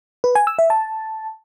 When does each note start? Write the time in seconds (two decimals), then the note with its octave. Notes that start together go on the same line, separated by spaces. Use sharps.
0.24 B4
0.35 G#5
0.47 E6
0.59 E5
0.70 A5